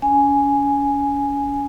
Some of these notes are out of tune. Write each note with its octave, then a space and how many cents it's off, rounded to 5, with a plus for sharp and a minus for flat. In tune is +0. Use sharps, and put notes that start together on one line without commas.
C#4 +35 G#5 +0